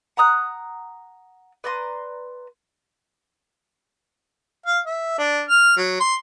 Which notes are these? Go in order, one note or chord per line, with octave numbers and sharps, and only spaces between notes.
F#5 A#5 D#6 F#6
B4 D5 A#5 C6
F5
E5
D4
F6
F#3
C6